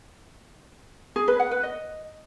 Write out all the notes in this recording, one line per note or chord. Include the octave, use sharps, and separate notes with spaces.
G#4
B4
F#5
B4
D#5